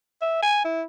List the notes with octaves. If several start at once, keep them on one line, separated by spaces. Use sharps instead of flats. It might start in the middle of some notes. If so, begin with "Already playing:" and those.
E5
G#5
E4